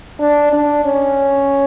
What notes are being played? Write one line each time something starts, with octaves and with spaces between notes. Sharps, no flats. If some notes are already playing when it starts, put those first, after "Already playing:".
D4
D4
C#4